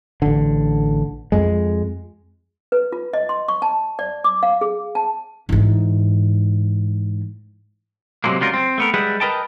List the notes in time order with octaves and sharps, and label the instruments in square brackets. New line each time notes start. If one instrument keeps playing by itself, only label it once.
[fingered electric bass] A1 D3
F2 G#3
[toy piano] B4
F4
D#5
C6
C#6
A5
D5
D6
F5
G#4
A5
[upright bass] G#2 E3
[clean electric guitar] C3 D#3 F#3 G#3 A#3
C#2 F#3 G3 F4 A#4
C4
A3 B3 A#4
G3 G#3 G#4 B4 E5 F#5
A#4 B4 D#5 G5 A5